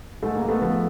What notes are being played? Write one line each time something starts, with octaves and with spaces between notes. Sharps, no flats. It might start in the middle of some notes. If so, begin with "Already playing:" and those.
G#2 A3
A#3
G#2
A3 B3
F3 A3 B3